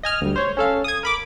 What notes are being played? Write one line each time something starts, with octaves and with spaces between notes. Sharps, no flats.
D#5 G#5 F6
D2 G3
C5 C#5
C#4 A4 F5
D#6 G#6
A#4 B5 D6